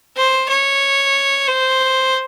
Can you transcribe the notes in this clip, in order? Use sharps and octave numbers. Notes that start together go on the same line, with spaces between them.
C5
C#5
C5